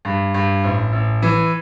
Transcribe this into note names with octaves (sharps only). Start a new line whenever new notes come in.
G2
G2
A1
A1
E3